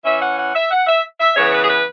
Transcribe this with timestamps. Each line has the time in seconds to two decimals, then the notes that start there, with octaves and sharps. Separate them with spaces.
0.05 E3 C#4 E5
0.20 F#5
0.37 F#5
0.54 E5
0.70 F#5
0.87 E5
1.19 E5
1.36 C#3 E3 B3 C#5
1.53 B4
1.63 G#4
1.69 B4